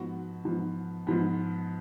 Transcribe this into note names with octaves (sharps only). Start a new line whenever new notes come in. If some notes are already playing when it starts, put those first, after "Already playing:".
Already playing: G#2 F3 B3 F#4
G#2 F3 B3
G#2 F3 B3